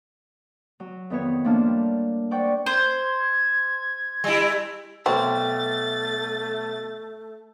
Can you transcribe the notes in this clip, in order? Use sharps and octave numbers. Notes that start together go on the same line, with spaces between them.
F#3
F2 D#3 B3 B4 C#5
F3 A3 A#3 D4 A5 F6
G3
C5 D5 F#5 G5 C#6
C5 G#6
G3 E4
B1 A3 C4 A6